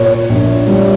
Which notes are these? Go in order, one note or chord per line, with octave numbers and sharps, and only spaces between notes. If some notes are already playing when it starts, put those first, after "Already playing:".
Already playing: A#2 C#5
A#1
G3